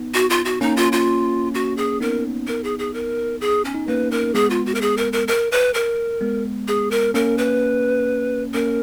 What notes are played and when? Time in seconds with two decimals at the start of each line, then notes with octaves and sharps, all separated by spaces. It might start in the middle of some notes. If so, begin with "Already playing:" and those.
Already playing: B3 D#4
0.14 F#4
0.30 F4
0.45 F#4
0.61 A#3 C#4 D#4
0.76 F4
0.92 F4
1.54 F#4
1.77 G#4
2.00 B3 D#4 A#4
2.47 A#4
2.64 G#4
2.79 G#4
2.94 A#4
3.41 G#4
3.65 C#4
3.75 D#4
3.87 A#3 C#4 B4
4.11 A#4
4.34 G#3 B3 G#4
4.50 F4
4.66 F#4
4.75 A#4
4.81 G#4
4.97 A#4
5.13 A#4
5.28 A#4
5.52 B4
5.74 A#4
6.21 G#3 B3
6.68 G#4
6.91 A#4
7.14 A#3 C#4 A#4
7.38 B4
8.54 A#3 C#4 A#4